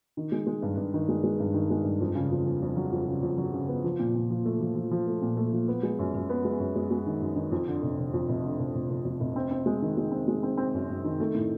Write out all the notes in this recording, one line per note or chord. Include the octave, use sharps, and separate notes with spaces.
D#3
G#3
G#3
G2
G2
D#3
G#3
G#3
G2
D#3
G#3
G2
F2
C#3
F2
F2
F2
F#3
F2
C#3
F2
F#3
C#3
B3
F3
A#2
A#2
F3
A3
F3
F3
F3
A3
A#2
A3
F3
B3
G#3
F#2
F#2
B3
G#3
F#2
G#3
G#3
D#3
F#2
D#3
F2
D3
F1
F1
F2
F1
D3
F1
F1
F1
F2
F1
C4
C4
G#3
D#3
G#3
C4
G#3
C4
C4
F#2
F#2
D#3
A3
A2